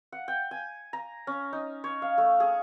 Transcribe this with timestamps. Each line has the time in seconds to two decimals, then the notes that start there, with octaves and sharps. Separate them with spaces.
0.12 F#5
0.28 G5
0.51 G#5
0.93 A#5
1.27 C#4
1.53 D#4
1.84 C#5
2.02 F5
2.18 A3
2.40 G#4